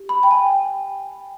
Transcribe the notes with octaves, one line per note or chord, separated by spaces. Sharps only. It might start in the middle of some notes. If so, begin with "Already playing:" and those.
Already playing: G4
B5
G5
G#5
G5